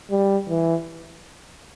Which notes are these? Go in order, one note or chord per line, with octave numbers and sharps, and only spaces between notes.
G3
E3